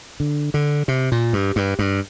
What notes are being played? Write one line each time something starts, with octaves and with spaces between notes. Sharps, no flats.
D3
D3
C3
A#2
G2
G2
G2